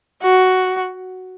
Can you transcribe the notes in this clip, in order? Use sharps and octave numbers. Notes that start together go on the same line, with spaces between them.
F#4